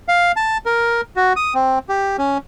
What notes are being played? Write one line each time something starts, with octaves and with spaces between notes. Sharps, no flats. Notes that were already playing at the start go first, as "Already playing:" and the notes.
F5
A5
A#4
F#4
D#6
C4
G4
C#4